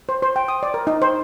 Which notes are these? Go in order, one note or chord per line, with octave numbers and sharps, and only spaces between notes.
C5
C5
G5
D#6
D5
A#4
D#4
C5